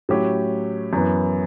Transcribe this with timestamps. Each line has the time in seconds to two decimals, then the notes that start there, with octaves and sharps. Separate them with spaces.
0.09 A2 F#3 C#4 G4
0.93 F#2 E3 B3